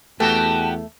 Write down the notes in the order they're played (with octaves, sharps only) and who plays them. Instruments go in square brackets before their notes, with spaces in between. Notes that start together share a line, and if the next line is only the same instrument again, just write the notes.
[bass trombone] E2 [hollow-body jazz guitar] A3 [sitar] B3 F#4 G4 [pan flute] A5